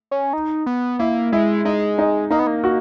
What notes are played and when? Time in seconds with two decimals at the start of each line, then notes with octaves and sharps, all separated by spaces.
0.11 C#4
0.33 D#4
0.66 B3
0.99 A#3 E4
1.32 G#3 E4
1.65 G#3 D#4
1.98 D#4
2.31 A#3 D#4
2.39 B3
2.47 A#3
2.64 F#4